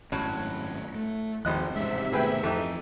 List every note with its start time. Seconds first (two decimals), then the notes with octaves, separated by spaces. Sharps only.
0.12 G#1 F#2 A2 F#3 C#4
0.95 A3
1.45 G#1 D#2 F3 D#5 F#6
1.75 A1 G#2 C3 G#3 C#4 E5
2.12 B2 D#3 A3 G#4 B4 G5
2.43 F2 E3 A3 D#4 G4